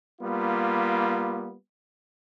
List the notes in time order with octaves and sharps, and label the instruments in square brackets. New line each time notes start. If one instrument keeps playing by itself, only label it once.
[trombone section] G3 A#3 B3 F4